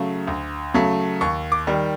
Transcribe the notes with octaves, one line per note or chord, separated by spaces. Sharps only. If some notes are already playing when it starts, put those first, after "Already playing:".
Already playing: C#3 F#3 A3
D2
C#3 F#3 A3
D#2 C#6
D6
D#3 G3